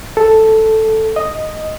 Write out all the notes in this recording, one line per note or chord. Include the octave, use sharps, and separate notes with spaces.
A4
D#5